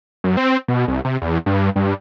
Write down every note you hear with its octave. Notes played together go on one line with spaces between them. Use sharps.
F#2
C4
B2
C2
C3
E2
G2
G2